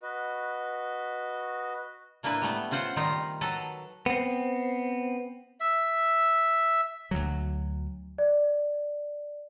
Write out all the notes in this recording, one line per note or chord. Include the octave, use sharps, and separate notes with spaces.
F#4 B4 D#5
A2 A#3 D4 E4 B4
G3 A3 B3
C#3 F4 C5 F#5
D#3 G3 C4 D#4 F4
F#3 A4 B4 A#5
B3 C4
E5
D2 F#3
D5